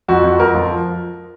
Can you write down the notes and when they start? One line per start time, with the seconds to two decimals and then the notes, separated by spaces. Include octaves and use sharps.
0.08 F2 F#4
0.24 F2
0.40 F2 A#4
0.55 F3